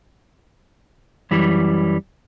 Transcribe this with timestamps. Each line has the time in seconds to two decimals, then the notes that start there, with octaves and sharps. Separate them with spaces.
1.31 F#2 E3 G3